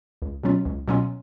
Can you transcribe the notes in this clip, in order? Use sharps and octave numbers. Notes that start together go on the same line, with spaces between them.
C#2
B2 F#3 C#4 F4
C#2
B2 F#3 C#4 F4